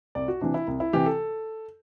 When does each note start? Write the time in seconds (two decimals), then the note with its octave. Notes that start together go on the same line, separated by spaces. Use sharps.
0.15 C2 D5
0.28 F#4
0.41 C3 E3 D4
0.54 E4
0.67 C2
0.80 E4
0.93 C3 E3 G4
1.06 A4